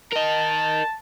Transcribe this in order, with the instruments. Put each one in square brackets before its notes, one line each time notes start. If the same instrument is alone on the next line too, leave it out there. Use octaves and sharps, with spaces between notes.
[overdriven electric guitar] A#4 D#5 [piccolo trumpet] A5